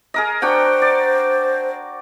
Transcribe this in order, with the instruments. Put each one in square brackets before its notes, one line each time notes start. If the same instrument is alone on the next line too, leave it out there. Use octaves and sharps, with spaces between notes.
[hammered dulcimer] G#4 A#4 D#5
[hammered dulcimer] D4 F#4 G5 [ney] C5
[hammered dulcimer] D5